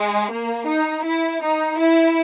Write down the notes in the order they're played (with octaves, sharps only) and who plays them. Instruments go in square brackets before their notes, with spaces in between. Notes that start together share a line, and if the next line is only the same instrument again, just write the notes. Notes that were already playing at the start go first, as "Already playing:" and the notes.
Already playing: [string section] G#3
A#3
D#4
E4
D#4
E4